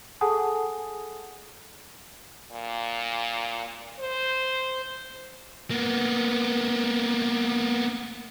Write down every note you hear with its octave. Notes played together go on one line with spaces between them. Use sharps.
G#4 A4 F#5 G#5 A5 D#6
A#2
C5
A#3 B3